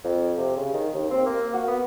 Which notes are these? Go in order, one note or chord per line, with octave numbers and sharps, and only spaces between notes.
F2
C3
C#3
D#3
D#2
C4
A#3
F#4
B3